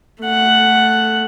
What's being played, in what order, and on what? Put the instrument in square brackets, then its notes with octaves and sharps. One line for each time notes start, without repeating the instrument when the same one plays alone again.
[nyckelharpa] A3 F#5